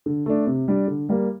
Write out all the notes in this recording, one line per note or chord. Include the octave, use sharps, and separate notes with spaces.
D3
A3 D4
C3
G3 D4
D3
G3 A#3